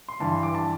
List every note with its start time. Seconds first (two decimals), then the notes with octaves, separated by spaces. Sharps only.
0.08 C6
0.20 G2 E3 A5
0.32 C6
0.43 D6
0.55 A5